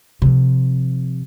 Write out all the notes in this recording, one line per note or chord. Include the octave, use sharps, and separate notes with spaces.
C3 F3